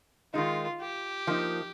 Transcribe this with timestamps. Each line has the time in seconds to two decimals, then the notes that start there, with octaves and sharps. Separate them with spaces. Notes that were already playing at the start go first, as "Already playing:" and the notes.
0.34 D#3 G#3 D#4 F4
0.81 G4
1.27 F3 A#3 D#4